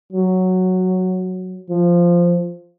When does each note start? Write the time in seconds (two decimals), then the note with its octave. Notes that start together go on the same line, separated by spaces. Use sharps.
0.13 F#3
1.70 F3